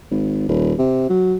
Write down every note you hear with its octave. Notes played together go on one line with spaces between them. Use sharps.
G#1
D#1
C3
F#3